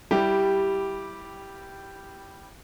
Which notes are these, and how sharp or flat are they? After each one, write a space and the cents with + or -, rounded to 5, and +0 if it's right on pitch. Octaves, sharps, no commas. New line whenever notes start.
G3 +0 E4 +0 G4 -5